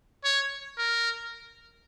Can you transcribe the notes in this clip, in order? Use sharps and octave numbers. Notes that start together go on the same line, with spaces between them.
C#5
A#4